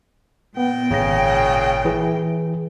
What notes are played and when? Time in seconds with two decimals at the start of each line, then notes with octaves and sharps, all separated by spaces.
0.57 A#2 B3 G5
0.91 G#1 C#3 A#6
1.85 E3 G#4